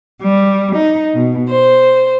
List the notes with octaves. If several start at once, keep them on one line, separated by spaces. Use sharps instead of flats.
G3
D#4
B2
C5